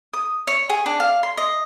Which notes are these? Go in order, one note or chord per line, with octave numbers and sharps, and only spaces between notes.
D#6
C#5
G#4
D4
F5
C6
D#5